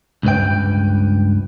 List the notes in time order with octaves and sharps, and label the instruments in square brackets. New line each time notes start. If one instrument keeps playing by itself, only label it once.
[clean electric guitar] C#2 G2 B4 G5